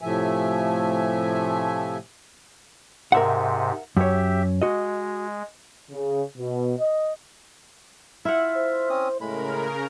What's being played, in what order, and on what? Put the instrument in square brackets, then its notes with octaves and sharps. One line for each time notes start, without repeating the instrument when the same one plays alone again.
[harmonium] A2 C3 F3 A3 E5 G#5
[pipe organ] G#2 C3 [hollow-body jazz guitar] A#4 E5 F#5
[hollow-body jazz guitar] F#2 C#5 [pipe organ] G4 E5
[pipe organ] G#3 [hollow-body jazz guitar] F#4 D#5
[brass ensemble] C#3
B2
D#5
[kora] E4 F#5 [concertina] F4 E5
[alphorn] C5
[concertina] C4 C#4 D#6
[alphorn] A2 [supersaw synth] C#3 A#4 [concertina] G#3 B5